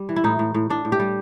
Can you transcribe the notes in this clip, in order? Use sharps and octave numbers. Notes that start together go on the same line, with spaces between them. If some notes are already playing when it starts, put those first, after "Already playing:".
Already playing: G3
E3
E4
A2 D#4
A2
A2
A2 D4
A2
G4
G3